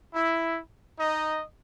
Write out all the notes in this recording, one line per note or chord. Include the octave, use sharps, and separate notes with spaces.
E4
D#4 D#5